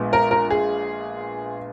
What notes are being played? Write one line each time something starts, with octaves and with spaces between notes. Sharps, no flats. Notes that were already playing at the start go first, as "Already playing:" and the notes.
Already playing: A#1 A#2 G#3 B3
A#4
A#4
G#4